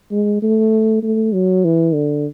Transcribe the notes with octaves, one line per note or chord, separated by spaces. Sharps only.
G#3
A3
A3
F#3
E3
D3